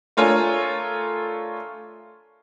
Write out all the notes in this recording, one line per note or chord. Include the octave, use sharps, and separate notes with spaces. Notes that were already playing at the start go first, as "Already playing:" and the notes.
A3 D4 F4 A#4 C#5 G#5